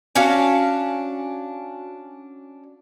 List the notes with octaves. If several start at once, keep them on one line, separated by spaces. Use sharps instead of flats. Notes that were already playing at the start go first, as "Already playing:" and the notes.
C#4 D4 F#4 F5